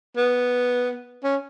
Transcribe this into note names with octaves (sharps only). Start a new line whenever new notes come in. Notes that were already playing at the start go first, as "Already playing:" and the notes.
B3
C#4